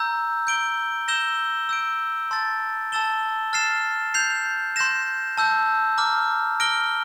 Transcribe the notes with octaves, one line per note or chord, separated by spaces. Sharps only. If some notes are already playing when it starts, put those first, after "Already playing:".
Already playing: A#5 E6 G6
G6 D7 G7
E6 G6 A#6 E7 G7
E6 G6 D7
A5 C6 E6 A6
A5 E6 A6 E7 G7
F6 A6 C7 E7
G6 C7 F7
C6 G6 A#6 E7
A5 E6 G6
A#5 D6 F6
F6 A#6 D7 G7